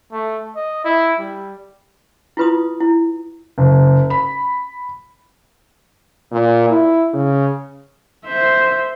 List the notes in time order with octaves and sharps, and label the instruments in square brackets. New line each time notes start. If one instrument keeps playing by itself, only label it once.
[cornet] A3
D#5
E4
G3
[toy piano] E4 F4 B4 C6 D#6
E4
[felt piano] F#1
B5
[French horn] A#2
E4
C#3
[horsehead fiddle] C5 E5